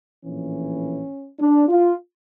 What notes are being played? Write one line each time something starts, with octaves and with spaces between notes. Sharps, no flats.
A#1 A2 E3 C#4
D4
F4